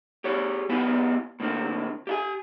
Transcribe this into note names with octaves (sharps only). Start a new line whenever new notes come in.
G4 G#4 C#5
B2 B3 E4 G4 B4 G#5
A2 D3 A#3 C4
G4 E5 G#5